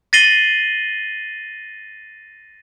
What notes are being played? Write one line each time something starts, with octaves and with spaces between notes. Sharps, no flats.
A6 A#6 C7 D#7 F#7 G7